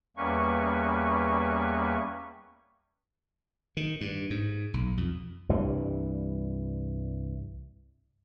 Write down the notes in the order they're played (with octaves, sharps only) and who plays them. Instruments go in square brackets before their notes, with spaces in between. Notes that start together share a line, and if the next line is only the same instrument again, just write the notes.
[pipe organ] E2 G3 A#3 C#4 B4 C#6
[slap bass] D#3
G2
G#2
B1
F2
C2 G2 E3 G3